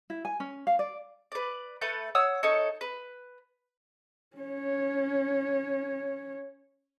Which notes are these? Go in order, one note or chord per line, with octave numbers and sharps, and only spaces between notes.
E4
G#5
C#4
F5
D5
B4 D5
A3 A4 B4 G6
C#5 F#5 D#6 E6
D#4 A4 C#5
B4
C#4 C#5